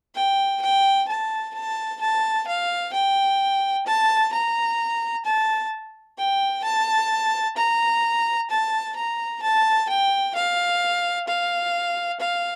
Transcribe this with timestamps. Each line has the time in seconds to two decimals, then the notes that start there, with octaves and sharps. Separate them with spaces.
0.15 G5
0.62 G5
1.08 A5
1.54 A5
2.01 A5
2.47 F5
2.93 G5
3.86 A5
4.33 A#5
5.25 A5
6.18 G5
6.64 A5
7.57 A#5
8.50 A5
8.96 A#5
9.42 A5
9.89 G5
10.35 F5
11.28 F5
12.20 F5